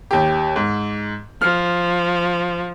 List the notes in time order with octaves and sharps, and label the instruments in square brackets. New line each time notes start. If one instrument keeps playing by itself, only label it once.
[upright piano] D#2 G4
G#2
[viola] F3 [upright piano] F6